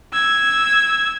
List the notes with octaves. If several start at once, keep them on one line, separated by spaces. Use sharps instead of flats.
E6 G#6